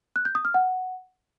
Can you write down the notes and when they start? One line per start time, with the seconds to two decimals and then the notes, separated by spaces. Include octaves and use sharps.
0.16 F#6
0.25 G6
0.35 D#6
0.45 F6
0.54 F#5